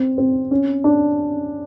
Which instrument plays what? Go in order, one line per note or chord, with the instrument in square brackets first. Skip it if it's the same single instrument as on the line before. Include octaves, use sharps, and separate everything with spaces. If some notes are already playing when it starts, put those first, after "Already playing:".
Already playing: [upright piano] C4
C4
C#4
D4